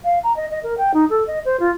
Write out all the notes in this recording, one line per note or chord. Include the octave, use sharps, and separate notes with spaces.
F5
A#5
D#5
D#5
A#4
G5
D#4
A4
D#5
C5
F4